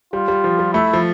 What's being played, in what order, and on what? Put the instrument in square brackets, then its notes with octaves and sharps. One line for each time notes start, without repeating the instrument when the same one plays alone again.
[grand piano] G3 [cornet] F4
[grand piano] G3
F3
G3
[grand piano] A3 [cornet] E4
[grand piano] F3